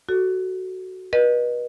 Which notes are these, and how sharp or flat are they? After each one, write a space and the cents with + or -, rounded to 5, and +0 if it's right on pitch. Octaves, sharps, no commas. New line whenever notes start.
F#4 +10 A4 +0
B4 -35 D#5 -30